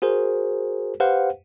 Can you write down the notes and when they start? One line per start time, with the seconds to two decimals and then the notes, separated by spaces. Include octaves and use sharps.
0.02 F#4 G#4 A#4 C5
1.00 G4 B4 C5 F5 F#5